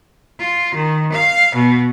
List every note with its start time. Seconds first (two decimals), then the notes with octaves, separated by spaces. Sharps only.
0.39 F4
0.74 D#3
1.13 F5
1.55 B2